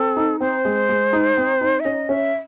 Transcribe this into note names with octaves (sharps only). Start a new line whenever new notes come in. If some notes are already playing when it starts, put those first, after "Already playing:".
Already playing: C4 A4
D#4
C4 C5
G#3
G#3
D#4
C4
D#4
E5
C#4 D#5
C#4 E5